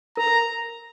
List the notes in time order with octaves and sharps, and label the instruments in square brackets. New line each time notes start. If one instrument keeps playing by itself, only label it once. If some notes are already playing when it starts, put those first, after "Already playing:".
[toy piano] A#4 [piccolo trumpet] A#5
[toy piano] A#4